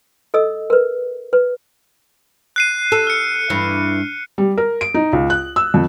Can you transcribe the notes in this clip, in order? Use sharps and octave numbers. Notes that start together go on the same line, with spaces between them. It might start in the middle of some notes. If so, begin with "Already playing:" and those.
A4 D#5 E6
A#4 B4
B4
F#6 C7 D#7
A4
F6 C#7
G2 E3
G3
A#4
D7
D#4
C#2
F#6
E6
F2